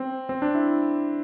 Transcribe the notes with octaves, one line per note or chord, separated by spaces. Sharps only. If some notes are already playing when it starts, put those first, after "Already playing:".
Already playing: C4
C4
D4
E4